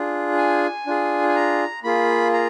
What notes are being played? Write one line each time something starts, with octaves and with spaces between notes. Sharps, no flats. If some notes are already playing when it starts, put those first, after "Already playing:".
Already playing: D4 F4 G#4
G#5
D4 F4 G#4
G#5
A#5
A#3 F4 G#4 B5
A#5